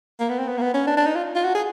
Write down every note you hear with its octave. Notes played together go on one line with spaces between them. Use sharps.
A#3
B3
C4
B3
A#3
B3
C#4
D4
D4
D#4
F4
F4
F#4
G#4